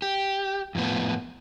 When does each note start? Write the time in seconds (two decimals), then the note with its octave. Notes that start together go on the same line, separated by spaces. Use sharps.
0.02 G4
0.75 F2 A2 F3 B3